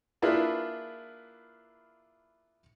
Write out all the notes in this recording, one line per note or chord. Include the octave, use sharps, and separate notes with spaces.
A#3 D4 E4 F4 G#4 B4